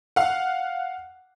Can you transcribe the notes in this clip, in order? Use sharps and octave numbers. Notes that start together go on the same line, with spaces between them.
F5 F#5